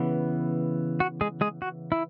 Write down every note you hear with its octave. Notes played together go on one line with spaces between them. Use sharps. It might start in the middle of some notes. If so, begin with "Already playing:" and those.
Already playing: C#3 E3 B3
F#4
G#3 G#4
G#3 G#4
F#4
E4